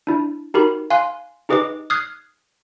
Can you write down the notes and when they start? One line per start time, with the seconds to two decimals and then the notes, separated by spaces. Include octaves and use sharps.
0.07 D4 E4
0.54 D#4 F#4 G4 A#4 B5
0.90 F5 G#5 C6 F#6
1.49 D#4 G4 G#4 B4 D#5 D6
1.90 D#6 F6 F#6 G#6 C7